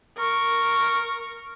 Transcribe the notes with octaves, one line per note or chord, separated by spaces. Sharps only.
A#4 C#6